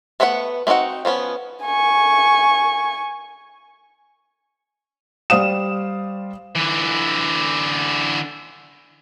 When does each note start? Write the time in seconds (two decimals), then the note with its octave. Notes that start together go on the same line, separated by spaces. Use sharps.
0.20 A3 B3 B4 C5 F#5
0.67 A3 C4 D#4 F#4 F#5
1.05 F3 A#3 B3 C#4
1.64 G#5 C#6
5.30 G3 C5 D5 F5 D#6 E7
6.56 D3 E3